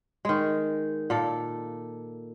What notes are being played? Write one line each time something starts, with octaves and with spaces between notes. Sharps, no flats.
D#3 G#3
A#2 A4